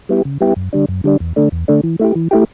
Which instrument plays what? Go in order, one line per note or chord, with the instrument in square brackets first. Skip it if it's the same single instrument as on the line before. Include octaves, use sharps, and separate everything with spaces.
[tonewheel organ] G3 B3 E4 G4
C#3
G3 B3 E4 G4
F#2
D3 G3 D4
F#2
D3 G3 D4
E2
D3 A3 D4
E2
D3 A3 D4
E3
A3 E4 G4
E3
A3 E4 G4